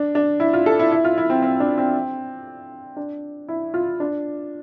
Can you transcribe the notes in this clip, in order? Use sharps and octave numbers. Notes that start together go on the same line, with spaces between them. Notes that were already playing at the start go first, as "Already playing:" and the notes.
Already playing: D4
D4
E4
F4
A4
E4
E4
F4
E4
C4
C4
D4
C4
D4
E4
F4
D4